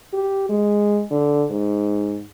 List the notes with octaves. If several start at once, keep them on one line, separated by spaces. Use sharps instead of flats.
G4
G#3
D3
G#2